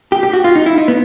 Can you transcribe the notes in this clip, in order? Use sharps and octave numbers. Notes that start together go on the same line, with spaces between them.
G4
G4
F#4
F4
D#4
E4
D#4
B3